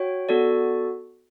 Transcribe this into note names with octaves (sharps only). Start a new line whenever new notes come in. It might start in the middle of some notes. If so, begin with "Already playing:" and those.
Already playing: F#4 C#5 G5
B3 F#4 A4 D5